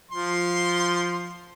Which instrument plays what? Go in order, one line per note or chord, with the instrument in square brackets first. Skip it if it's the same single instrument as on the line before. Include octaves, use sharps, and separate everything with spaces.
[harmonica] F3 C6